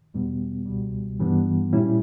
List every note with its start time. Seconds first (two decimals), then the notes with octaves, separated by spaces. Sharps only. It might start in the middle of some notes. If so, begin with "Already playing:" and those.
0.14 E2 B2 G3 B3
0.66 C#2 B2 G3
1.20 G2 E3 G3 B3 D4
1.73 A#2 G3 C#4 E4